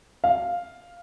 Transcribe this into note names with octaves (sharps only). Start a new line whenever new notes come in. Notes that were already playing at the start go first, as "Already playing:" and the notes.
F5